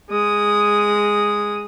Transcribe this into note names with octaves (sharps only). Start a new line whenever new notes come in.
G#3 D#6